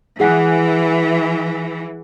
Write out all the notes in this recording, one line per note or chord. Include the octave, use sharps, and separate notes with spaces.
E3 G#4 F#5